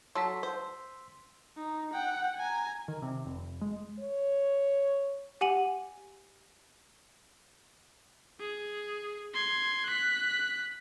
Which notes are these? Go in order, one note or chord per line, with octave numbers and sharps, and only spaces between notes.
F#3 A4 C6 E6 B6
C5
D#4
F#5 G5
G#5 A#5
D#3
C3
F1
G#3
C#5
G4 F#5 G#5 D#7 F#7
G#4
C6 G#6
F#6 B6